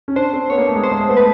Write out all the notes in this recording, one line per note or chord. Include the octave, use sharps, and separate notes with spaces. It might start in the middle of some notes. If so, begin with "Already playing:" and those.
C#4
D4 C5
C4
B3 C#5
A#3
A3
G#3
A3 C5
G#3
A3
B3
A3 B4